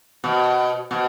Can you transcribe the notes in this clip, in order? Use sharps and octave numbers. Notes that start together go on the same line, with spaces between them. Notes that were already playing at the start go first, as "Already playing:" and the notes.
B2
B2